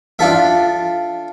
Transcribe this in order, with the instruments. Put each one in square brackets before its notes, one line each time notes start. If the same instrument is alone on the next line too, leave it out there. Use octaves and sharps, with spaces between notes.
[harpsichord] D4 F4 A4 E5